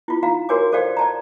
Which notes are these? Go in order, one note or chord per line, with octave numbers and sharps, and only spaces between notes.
E4 F4
D#4 F4 F5 A#5
F#4 G4 A#4 C#5 G#5 D6
A4 C5 D5 F5 G5
D5 A5 A#5